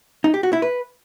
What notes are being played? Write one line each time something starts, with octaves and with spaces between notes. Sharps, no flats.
D#4
G4
F#4
E4
B4